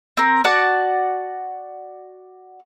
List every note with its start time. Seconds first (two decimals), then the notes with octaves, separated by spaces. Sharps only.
0.17 C4 A#4
0.44 F#4 D5 F#5 A5